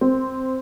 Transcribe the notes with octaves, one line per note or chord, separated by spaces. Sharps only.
C4